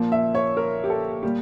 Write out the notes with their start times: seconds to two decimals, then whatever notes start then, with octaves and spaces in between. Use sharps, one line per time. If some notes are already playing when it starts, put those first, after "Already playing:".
Already playing: A#2 F3 A#3
0.12 E5
0.35 C#5
0.57 A#4
0.84 G4
0.90 A4
1.23 A#2 G3 A#3 G4